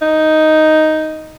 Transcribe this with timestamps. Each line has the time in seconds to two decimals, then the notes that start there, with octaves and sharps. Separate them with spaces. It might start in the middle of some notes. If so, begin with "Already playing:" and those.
0.02 D#4